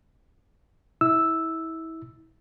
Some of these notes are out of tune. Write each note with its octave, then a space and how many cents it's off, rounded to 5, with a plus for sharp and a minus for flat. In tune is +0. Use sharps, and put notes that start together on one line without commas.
E4 -25 E6 +0